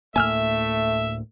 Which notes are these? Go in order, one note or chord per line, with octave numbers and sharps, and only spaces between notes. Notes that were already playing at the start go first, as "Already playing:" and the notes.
D2 A2 A3 A#3 E5 G#5 E6 F6